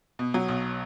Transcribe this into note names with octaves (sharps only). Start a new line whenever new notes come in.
B2
F#3
B1